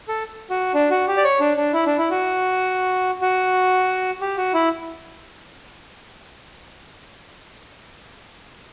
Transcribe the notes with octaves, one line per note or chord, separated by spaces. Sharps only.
A4
F#4
D4
F#4
G4
D5
C#5
D4
D4
E4
D4
E4
F#4
F#4
G4
F#4
E4